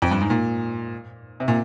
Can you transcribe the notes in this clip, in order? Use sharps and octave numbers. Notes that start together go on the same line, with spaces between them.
F2
G2
G#2
A#2
C3
A#2